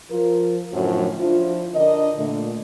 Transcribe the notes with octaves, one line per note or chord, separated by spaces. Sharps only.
F3 F4 A#4
F#2 A2 D3 F3 F#4
F3 D4 E4 F4
D3 D4 A#4 D#5
A#2 D3 A3